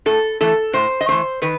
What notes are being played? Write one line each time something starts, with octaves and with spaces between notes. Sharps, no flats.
A2 A4
E3 A3 A4
A2 C5
D#5
E3 A3 C5
D#3 B4